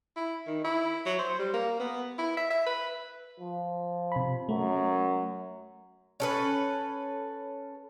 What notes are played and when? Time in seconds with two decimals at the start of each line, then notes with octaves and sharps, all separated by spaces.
0.16 E4
0.47 D#3
0.64 E4
1.06 F#3
1.19 C5
1.39 G3
1.54 A#3
1.80 B3
2.18 E4
2.37 E5
2.50 E5
2.66 B4
3.40 F3
4.12 C3 B5
4.49 F#2 A3
6.20 C#4 A4 B4